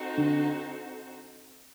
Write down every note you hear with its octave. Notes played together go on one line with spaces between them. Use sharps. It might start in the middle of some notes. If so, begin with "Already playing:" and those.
Already playing: C4 D#4 F#4 A4 C5
D3